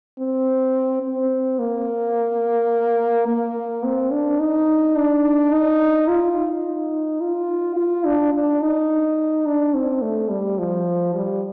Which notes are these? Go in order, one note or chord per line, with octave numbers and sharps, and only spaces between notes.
C4
C4
A#3
A#3
C4
D4
D#4
D4
D#4
F4
D#4
F4
F4
D4
D4
D#4
D4
C4
A3
G3
F3
G3